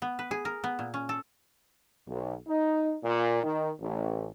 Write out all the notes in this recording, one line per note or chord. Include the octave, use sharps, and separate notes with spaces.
B3
B4
G#4
A#4
B3
A#2
C#4
A4
B1
D#4
A#2
D#3
A1